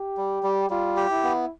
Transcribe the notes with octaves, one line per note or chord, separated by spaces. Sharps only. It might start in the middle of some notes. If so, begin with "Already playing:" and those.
Already playing: G4
G3
G3
G3 F4
G4
E4
B3